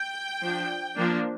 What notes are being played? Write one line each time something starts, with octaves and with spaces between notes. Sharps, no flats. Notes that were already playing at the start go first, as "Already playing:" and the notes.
Already playing: G5
F3 D4
F3 A#3 D4